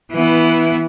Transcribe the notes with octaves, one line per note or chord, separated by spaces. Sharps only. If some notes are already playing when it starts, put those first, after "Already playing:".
E3 B3 E4